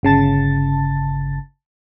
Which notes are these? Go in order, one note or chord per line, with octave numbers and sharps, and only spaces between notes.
G1 C#3 A5 A6